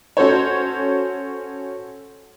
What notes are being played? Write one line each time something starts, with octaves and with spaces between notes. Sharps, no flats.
C#4 F#4 A4 C5 C#5